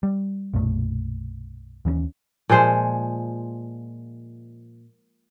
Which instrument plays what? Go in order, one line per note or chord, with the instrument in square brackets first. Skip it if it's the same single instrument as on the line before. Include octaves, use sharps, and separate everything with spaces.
[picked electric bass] G3
B1 F#2 A#2 A3
D#2 E3 A#3 C#4
[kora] A#2 F3 G#3 C5